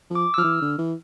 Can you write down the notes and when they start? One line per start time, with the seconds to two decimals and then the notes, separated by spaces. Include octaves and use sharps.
0.10 F3
0.15 D6
0.34 E6
0.38 F3 F6
0.44 E3
0.62 D3
0.78 E3